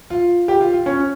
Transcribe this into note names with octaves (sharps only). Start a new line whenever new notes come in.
F4
G4
F4
F4
C#4